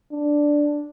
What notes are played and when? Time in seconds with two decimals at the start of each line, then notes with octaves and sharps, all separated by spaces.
0.13 D4